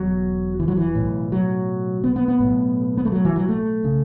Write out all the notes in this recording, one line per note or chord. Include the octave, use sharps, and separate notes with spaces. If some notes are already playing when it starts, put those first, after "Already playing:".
Already playing: E1 B2 F#3
E3
F#3
E3
B1 A2
F#3
B3
B3
B3
B1 A2
B3
A3
F#3
E3
F#3
A3
C#3